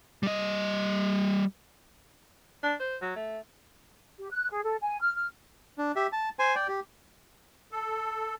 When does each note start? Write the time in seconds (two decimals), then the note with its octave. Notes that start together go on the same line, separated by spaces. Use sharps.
0.23 G3 D#5
2.63 D4
2.80 C5
3.02 F#3
3.16 A3
4.19 G4
4.31 F#6
4.50 G#4
4.64 A4
4.82 G#5
5.01 F6
5.15 F6
5.78 D4
5.96 G4 E5
6.12 A5
6.39 C5 G#5
6.55 D5 G5
6.68 G4
7.72 A4